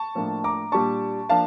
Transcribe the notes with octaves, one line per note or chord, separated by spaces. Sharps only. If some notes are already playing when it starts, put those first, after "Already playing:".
Already playing: A5 C#6
A2 F3 A#3 D4
A#5 D6
A#2 G3 D4 A5 C#6
F3 A#3 D4 F5 A5